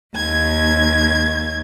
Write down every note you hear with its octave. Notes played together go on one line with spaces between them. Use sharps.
D#2 G#6